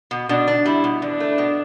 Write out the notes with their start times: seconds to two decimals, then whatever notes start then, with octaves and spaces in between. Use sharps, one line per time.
0.11 B2
0.29 B2 D4
0.47 D4
0.66 G3 E4
0.84 B2
1.01 E2 D4
1.20 A3
1.38 B2